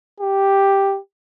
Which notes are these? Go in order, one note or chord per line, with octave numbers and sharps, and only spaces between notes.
G4